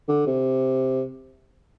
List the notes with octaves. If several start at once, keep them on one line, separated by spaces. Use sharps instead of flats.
D3
C3